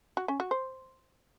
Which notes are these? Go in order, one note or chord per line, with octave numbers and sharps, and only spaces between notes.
F#4
C#4
F#4
C5